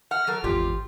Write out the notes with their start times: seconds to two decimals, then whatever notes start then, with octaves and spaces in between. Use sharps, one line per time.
0.11 F#5 F6
0.27 F#3 A4 A#4
0.44 G#1 E2 F4 G4